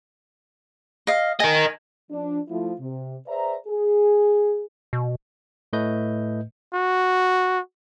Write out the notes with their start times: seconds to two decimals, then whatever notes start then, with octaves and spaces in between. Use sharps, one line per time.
1.07 D#5 F5
1.40 A#4 D#5 G#5
2.11 F3 D4
2.48 F3 A3 E4 F4
2.79 C3
3.27 G#4 B4 C5 D5 E5 A#5
3.67 G#4
4.93 B2
5.73 A2 A3 B4 D#5 G6
6.74 F#4